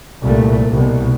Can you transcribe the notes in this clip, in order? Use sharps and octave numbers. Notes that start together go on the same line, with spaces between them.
C2 A#2 A3
C2 B2